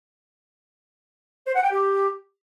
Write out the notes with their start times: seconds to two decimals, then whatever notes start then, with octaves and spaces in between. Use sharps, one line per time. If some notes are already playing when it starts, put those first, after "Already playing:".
1.47 C5
1.55 F#5
1.63 G5
1.71 G4